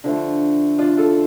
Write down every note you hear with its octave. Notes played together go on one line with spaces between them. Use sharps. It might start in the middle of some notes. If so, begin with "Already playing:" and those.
D3 F3 A3
D4 F4
F4 A4